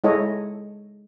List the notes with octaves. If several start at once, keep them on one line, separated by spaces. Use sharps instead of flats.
G#3 E4 A4 C#5 D#5